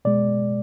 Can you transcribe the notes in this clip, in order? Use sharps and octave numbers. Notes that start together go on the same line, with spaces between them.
B2 G#3 D5